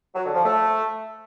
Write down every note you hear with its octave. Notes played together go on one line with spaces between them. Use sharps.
F#3
D3
F3
A3